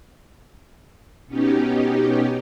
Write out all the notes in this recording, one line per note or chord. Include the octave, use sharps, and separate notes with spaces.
B2 B3 C#4 D#4 G4